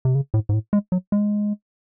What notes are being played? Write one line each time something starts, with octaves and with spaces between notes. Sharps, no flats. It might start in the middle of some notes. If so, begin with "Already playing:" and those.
C3
C#3
A2
G#2
A2
G#3
F#3
G#3